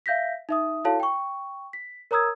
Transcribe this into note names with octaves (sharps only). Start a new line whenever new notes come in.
E5 F5 G6 A#6 B6
D#4 E5 D#6
E4 F#4 A4 C#5 F5 A5
G5 C#6
B6
A#4 C#5 A#5 D#6 E6 G#6